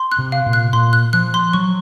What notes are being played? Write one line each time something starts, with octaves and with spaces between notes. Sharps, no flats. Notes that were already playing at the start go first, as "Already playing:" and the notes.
Already playing: C6
F#6
C3
F5
A#2
F#6
A#2 C6
F#6
F3 F#6
C6
F#3 C#6